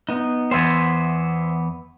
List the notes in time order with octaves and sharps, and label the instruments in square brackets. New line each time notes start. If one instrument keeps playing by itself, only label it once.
[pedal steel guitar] B3 D#4
[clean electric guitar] E2 B3 [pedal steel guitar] C5 E5 G#5